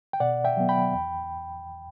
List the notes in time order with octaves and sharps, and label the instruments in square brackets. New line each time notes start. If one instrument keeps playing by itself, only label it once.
[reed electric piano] G5
B2 D5 F#5
E5 G5
F#3 B3
G5 B5
E2